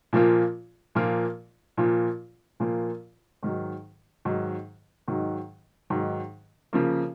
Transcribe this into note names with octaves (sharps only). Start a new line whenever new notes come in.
A#2 F3 A#3 F4
A#2 F3 A#3 F4
A#2 F3 A#3 F4
A#2 F3 A#3 F4
G#2 D#3 F#3
G#2 D#3 F#3
G#2 D#3 F#3
G#2 D#3 F#3
C#3 F3 A#3